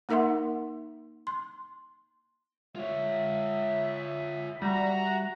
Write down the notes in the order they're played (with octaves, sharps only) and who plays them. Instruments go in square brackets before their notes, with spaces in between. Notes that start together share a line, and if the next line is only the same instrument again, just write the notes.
[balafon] A#3 D#4 A#4 E5 F#5 C6
C6
[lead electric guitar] F4 C#5 [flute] E5
[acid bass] G3 [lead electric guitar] F#4 [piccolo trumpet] A#5